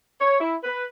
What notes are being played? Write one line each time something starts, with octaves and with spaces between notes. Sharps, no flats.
C#5
E4
B4